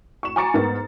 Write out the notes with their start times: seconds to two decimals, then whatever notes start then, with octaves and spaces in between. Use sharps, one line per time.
0.23 C#6 E7
0.36 G#5 A#5 C#6 D6 A6 C#7
0.54 G#2 B3 A#4 A6